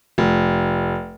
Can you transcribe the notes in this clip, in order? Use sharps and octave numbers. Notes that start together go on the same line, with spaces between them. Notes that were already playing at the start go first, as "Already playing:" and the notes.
F1